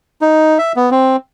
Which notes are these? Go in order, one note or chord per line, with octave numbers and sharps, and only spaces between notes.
D#4
E5
B3
C4